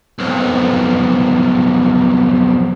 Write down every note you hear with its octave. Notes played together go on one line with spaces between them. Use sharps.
B1 F2